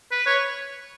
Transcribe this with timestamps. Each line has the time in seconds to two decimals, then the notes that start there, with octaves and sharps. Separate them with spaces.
0.12 B4
0.26 C#5